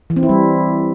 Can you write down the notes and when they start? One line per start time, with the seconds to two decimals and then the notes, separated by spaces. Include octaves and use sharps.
0.10 E3
0.16 C4
0.23 E4
0.29 G3